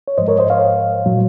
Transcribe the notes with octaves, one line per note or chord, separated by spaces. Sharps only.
C#5
G#2 F3 G#3 C5 D#5
A#4 C#5
C5 D#5
C#5 F5
A#2 F#3